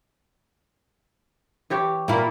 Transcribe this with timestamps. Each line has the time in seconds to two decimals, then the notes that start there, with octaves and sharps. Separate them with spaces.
1.70 E3 G4 C#5
2.08 A#2 A#3 E4